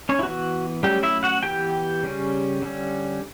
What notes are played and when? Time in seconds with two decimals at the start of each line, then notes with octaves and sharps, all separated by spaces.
0.09 C#4 C#5
0.19 E4
0.23 E3 B3 F#4
0.83 F#3 G3 A3 C#4 G4
1.03 E4 E5
1.23 F#4 F#5
1.43 E3 B3 G4 G5
2.03 C#3 G3 C#4
2.62 D3 G3 C#4